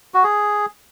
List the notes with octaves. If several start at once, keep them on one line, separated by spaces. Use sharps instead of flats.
F#4
G#4